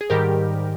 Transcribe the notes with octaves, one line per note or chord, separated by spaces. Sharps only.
G#4
G#2 D#3 G3 G4 A#4